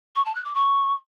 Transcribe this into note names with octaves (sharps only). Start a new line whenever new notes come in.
C#6
A5
F#6
D6
C#6